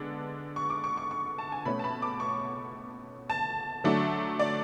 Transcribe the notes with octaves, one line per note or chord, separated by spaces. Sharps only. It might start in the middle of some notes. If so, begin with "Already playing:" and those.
Already playing: D3 G#3 B3 D4
C#6
D6
C#6
C#6
C#6
A5
G#5
B2 A3 C#4 B5
A5
B5
D6
C#6
A5
D3 F#3 A3 D4
D5